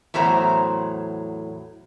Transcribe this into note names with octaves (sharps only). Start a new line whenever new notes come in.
E2 A2 F#3 C5 A#5